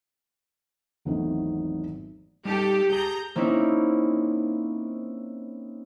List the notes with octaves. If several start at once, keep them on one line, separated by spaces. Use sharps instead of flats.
G#1 E2 F#3 A3 C4 D#4
G3 D#4 G4 A4 G5
G4 G#4 A5 A#5 G6
A#3 C4 C#4 D#4 E4